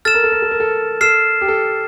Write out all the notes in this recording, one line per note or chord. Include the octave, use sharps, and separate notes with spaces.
A4 F6 A6 E7
A#4
A4
A#4
A4
A#4
A4
A4 F6 C7 E7
G4
A4